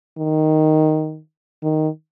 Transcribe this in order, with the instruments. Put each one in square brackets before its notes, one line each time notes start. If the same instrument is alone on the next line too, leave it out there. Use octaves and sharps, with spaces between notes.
[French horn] D#3
D#3